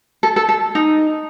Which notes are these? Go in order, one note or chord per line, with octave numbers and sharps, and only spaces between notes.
A4
A4
A4
D#4